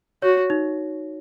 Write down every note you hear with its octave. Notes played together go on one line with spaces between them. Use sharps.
F#4 C#5
D#4